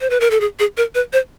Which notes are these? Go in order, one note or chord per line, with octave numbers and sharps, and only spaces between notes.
C5
B4
A#4
A4
G#4
G#4
A#4
B4
C5